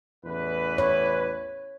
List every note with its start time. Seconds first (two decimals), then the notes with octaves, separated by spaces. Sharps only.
0.25 A1 E2 B4
0.78 C#5